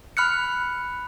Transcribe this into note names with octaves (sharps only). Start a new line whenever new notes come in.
B5 F6 F#6 C#7